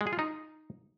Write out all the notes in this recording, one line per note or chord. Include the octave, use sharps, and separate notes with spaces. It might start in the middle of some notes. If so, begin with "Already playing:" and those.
G#3
G#4
F4
D#4